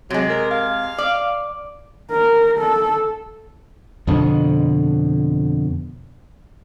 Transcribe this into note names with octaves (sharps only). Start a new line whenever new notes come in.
C3 F#3 G#3
A#4
F5
D5
A#4
A4
F2 B2 D3